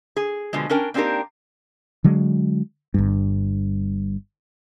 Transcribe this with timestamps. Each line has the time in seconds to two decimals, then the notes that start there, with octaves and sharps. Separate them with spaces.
0.16 G#4
0.53 B2 D3 F3 G#3
0.70 C#4 D4 A#4 G5
0.94 A#3 C4 D4 D#4 G4 A#4
2.04 D3 F#3 G#3
2.94 G1 G2